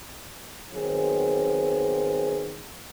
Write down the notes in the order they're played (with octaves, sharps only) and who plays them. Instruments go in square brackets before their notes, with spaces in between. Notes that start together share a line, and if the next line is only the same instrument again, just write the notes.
[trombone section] D#3 F#3 B3 C4 G#4